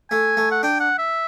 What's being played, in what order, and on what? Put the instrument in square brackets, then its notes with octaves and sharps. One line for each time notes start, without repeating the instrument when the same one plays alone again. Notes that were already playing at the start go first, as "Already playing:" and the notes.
[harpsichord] A3 [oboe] G#5
[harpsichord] A3
[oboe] F#5
[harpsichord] D4 [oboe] G5
[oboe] F#5
E5